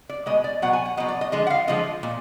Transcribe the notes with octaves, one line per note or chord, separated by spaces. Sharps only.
D5
B2 G#3 D#5
D5
B2 F#3 F#5
G#5
F#5
B2 F#3 D#5
D5
D#5
D3 F3 G#3 D#5
F#5
F5
D3 F3 G#3 D#5
A#2